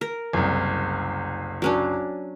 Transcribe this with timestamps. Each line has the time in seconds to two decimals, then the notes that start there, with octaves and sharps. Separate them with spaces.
0.01 A#4
0.33 F#1 C2
1.62 F#3 C#4 D4